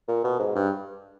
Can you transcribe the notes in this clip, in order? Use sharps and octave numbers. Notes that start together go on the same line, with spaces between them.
A#2
B2
G#2
G2